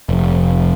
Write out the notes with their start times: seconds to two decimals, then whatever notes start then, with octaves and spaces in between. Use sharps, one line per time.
0.09 F1